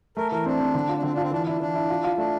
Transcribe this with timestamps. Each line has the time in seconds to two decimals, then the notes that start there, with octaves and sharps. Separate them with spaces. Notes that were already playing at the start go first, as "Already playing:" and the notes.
0.17 A3 A#4
0.32 E3 A#4
0.46 C4 D4
0.60 C4
0.74 D3
0.89 F4
0.97 D4
1.03 D3 C4
1.13 D4
1.17 F4
1.22 C4
1.31 E3 D4
1.47 D4 E4
1.60 E3 D4
1.75 E4
1.90 F4
2.04 F4
2.18 A3 D4